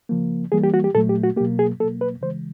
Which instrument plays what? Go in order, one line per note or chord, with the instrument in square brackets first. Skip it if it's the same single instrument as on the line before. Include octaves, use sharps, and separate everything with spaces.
[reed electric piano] C#3 F3 A#3
E3 G3 A#3 G#4
G4
F#4
G4
A#2 F#3 A3 A4
G4
F#4
B2 F#3 A#3 G4
G#4
B2 F#3 A#3 A4
B4
C#3 E3 G#3 C5